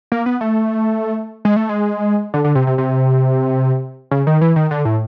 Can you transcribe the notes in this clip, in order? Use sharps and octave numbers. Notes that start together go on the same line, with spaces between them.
A#3
B3
A3
G#3
A3
G#3
D3
D3
C3
C3
C3
C#3
D#3
E3
D#3
D3
A2